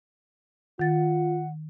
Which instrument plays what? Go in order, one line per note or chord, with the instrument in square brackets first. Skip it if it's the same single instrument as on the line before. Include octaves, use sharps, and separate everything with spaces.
[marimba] D#3 A6 [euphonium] F4 [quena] F#5